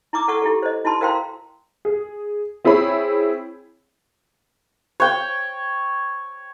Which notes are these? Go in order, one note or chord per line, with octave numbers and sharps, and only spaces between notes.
E4 A#5 D6 D#6
A4 F#5 C#6 D#6
E4 G4 A4
C5 D#5
E4 F#4 A5 C6
A#4 C5 F5 G5 A#5 C6
G#4
C4 E4 G#4 C#5 B5
C#5 G5